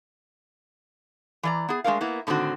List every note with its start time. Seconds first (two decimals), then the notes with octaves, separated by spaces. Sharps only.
1.43 E3 D5 A#5
1.69 B3 G#4
1.84 G#3 A3 D4 A#4 F5
2.01 A#3 B3 E4
2.27 A2 D3 D#3 C4 F#4